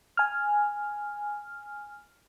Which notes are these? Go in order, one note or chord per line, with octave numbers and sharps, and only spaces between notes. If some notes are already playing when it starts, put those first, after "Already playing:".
G#5 F6